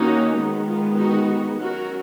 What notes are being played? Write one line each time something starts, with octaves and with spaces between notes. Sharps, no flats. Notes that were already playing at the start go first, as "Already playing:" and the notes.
Already playing: D#3 A#3 C#4 D#4 F#4
D#3 G#3 B3
F4
D#4 F#4
F#3 C#4 F#4 A#4